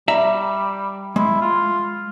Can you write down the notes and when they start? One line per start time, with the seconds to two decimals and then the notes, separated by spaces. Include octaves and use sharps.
0.08 G3 D5 E5 A#5
1.16 G#3 E4
1.41 F4